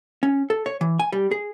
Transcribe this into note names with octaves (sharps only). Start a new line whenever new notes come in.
C#4
A4
C#5
E3
G#5
G3
G#4